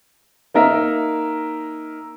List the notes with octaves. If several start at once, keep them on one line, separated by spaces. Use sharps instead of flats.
A#3 D#4 A#4 E5